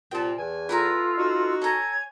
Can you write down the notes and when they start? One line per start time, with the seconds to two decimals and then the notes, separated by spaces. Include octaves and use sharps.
0.11 C2 A#2 G5 A5
0.38 E2 G#5
0.69 E4 F4 A4 B4 A#5
1.16 D#4 F#4
1.62 A4 C#5 G#5 A#5 G#6